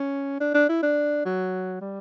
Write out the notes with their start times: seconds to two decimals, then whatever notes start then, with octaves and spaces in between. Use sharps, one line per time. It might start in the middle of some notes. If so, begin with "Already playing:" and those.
Already playing: C#4
0.40 D4
0.54 D4
0.69 E4
0.83 D4
1.25 F#3
1.81 G3